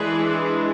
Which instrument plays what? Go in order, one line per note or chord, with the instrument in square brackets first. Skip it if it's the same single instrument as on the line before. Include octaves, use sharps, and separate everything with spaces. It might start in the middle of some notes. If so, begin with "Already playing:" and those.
Already playing: [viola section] E3 G#3 D4 G#4 B4